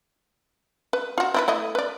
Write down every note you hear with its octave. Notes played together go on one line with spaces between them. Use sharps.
B4
F4 F#4
C4 E4 B4
A3 E4 D#5
B4 D5